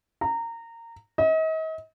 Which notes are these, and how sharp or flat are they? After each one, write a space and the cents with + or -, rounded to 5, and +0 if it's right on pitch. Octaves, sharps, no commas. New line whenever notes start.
A#5 -20
D#5 +40